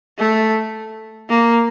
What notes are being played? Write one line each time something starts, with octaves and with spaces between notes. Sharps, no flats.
A3
A#3